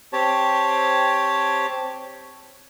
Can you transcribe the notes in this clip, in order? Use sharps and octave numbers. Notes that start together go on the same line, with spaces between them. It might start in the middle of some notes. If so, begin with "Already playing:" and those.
C4 G4 C#5 A5